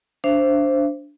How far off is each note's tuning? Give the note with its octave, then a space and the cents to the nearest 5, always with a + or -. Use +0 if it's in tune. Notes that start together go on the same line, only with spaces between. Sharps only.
D4 -10 C5 +0 E5 +40